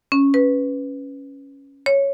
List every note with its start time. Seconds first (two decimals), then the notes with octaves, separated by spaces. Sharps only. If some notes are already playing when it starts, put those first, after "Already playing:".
0.12 C#4
0.34 B4
1.86 C#5